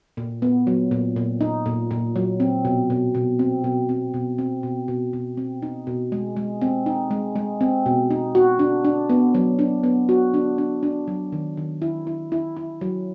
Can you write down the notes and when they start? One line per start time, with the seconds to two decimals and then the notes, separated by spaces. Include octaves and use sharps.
0.17 A#2
0.42 B3
0.67 F#3
0.91 A#2
1.16 A#2
1.41 D#4
1.66 A#2
1.91 A#2
2.16 F#3
2.40 C4
2.65 B2
2.90 B2
3.15 B2
3.39 C4
3.64 B2
3.89 C4
4.14 B2
4.38 C4
4.63 B2
4.88 B2
5.13 B2
5.37 C4
5.62 D#4
5.87 B2
6.12 G#3
6.37 G#3
6.61 C4
6.86 D#4
7.11 G#3
7.36 G#3
7.61 C4
7.86 B2
8.11 D#4
8.35 F#4
8.59 D4
8.85 D4
9.10 B3
9.35 F#3
9.59 D4
9.83 B3
10.09 F#4
10.34 D4
10.58 D4
10.83 D4
11.08 F#3
11.32 D#3
11.57 D#3
11.82 E4
12.07 E4
12.32 E4
12.57 E4
12.81 F#3